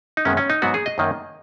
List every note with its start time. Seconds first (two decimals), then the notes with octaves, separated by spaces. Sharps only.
0.17 D#4
0.25 F#2 D#3 G#3 B3 C#4
0.37 C#4
0.50 D#4
0.62 G#2 F#3 B3 F#4
0.74 G#4
0.86 D#5
0.98 F#2 D#3 A#3